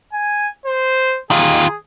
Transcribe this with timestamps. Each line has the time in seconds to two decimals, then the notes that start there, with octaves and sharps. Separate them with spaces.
0.13 G#5
0.66 C5
1.31 D#3 F4 G#4